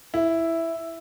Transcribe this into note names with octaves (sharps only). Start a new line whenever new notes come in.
E4